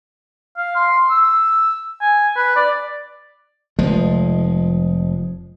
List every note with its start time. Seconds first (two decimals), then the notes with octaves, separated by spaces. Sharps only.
0.58 F5
0.76 C6
1.10 E6
2.01 G#5
2.36 B4
2.56 D5
3.79 F1 F3 G#3